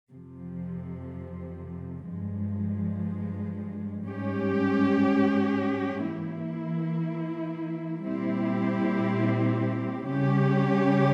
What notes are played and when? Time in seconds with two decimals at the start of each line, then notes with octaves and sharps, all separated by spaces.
0.11 F2 C3 F3
2.09 G2 F3 G#3
4.08 G#2 G3 C#4 G4
6.07 E3 A#3 E4
8.06 A#2 G3 C4 E4 G4
10.05 C#3 G3 C#4 G4